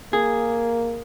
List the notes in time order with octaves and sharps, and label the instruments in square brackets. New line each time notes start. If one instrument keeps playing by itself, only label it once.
[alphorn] A#3 [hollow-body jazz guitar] G#4